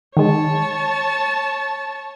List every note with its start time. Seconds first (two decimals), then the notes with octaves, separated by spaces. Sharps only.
0.17 D#3 G#3 C#5 A5